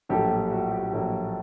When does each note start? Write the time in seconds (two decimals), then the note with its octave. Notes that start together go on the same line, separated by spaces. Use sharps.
0.09 A#1 A2 F#3 A#3 G4 A4
0.31 G4
0.52 F#4
0.71 G4
0.93 A#1 A2 F#3 A#3